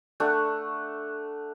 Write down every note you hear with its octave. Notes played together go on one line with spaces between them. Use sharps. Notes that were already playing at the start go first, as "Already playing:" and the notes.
A3 D4 F#5